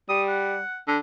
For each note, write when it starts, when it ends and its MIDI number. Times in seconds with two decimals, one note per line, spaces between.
0.09 0.61 55
0.09 0.23 87
0.28 0.78 78
0.88 0.98 50